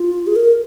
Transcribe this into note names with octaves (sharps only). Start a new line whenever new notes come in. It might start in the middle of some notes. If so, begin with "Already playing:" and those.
Already playing: F4
G#4
A#4